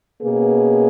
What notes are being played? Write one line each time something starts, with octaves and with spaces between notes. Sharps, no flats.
B2 A#3 C#4 G#4 B4